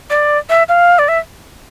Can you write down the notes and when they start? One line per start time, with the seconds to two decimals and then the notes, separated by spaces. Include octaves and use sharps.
0.10 D5
0.49 E5
0.68 F5
0.99 D5
1.08 E5